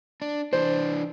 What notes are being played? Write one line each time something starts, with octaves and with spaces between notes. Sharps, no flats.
D4
E3 D4 C5